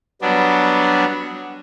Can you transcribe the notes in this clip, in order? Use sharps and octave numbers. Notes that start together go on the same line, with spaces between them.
F#3 G3 B3 D4